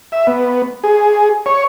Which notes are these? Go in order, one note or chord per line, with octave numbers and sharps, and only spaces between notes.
E5
B3
G#4
C#5